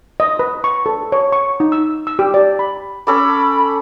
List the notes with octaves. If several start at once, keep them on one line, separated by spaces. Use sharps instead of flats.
D#5
B4
C#6
A4
C#5
C#6
D#4
E6
E6
G4
D5
B5
C#4 A4 B5 D6